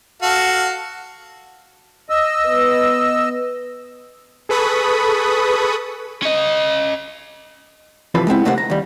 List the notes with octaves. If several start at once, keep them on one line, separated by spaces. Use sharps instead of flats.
F#4 A4 F5
D#5 E6
B3 B4
G#4 A4 B4 B5 C#6 D#6
C#4 D#5
C3 E3 F3 A4 B4 B5
G#3 B3 C4 E4
C3 A3 A#3 D#4 C5 F#5
A#5
D#2 G3